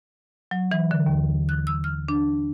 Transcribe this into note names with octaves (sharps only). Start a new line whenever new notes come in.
F#3
E3
D3
D#2
F#6
E6
F6
D4